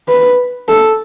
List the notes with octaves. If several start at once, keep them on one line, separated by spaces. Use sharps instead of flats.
B4
A4